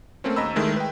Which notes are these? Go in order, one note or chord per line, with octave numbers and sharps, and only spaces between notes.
A3 A#3 C4 C#4
D#2 D#5 A#5 B5 E6
D#3 G#3 A3 E4
B4 G5